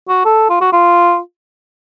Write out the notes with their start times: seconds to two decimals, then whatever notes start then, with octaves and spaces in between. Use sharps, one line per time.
0.09 F#4
0.25 A4
0.50 F4
0.61 F#4
0.73 F4